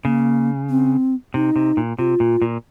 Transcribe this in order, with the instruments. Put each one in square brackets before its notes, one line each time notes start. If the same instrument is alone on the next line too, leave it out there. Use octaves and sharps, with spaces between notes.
[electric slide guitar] C#3 [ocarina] A#3
[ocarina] C4
[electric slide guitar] C3 [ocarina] D#4
[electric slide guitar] C3
A#2
[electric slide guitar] C3 [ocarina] F4
[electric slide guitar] A#2
A#2